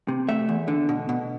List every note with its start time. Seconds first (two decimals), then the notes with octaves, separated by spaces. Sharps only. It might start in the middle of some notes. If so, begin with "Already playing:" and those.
0.08 C3
0.28 A3 E5
0.49 E2
0.68 D3
0.89 B2
1.09 B2